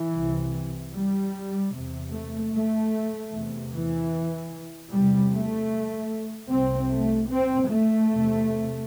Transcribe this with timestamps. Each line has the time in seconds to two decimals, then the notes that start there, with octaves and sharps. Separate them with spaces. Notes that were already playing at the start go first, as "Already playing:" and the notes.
Already playing: E3
0.14 C2 C3
0.94 G3
1.73 E2 C3
2.13 A3
2.53 A3
3.32 E2 C3
3.72 E3
4.91 E2 C3 G3
5.31 A3
6.50 C2 C3 C4
6.90 A3
7.30 C4
7.69 A3
8.09 E2 C3